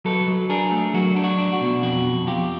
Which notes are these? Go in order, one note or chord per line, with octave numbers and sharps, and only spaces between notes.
F#3 A4 B4
F#3
D4 G#4 A#4
A3
F#3 F#4
D4
F#4
D4
F#4
B2
F2 F#4
F2
F2 F4 G4